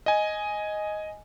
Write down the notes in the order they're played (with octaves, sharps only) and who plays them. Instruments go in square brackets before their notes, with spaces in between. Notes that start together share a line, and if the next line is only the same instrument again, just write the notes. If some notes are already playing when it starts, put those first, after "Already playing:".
[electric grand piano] D#5 G#5